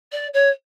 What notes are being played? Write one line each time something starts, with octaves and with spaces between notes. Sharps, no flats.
D5
C#5